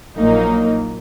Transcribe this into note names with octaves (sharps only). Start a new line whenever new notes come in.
A#1 A#2 F#3 A#3 D#4